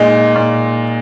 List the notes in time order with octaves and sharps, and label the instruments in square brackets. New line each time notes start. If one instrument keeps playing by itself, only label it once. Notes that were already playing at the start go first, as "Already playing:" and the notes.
Already playing: [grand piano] A#2 G#3 D#4
A#2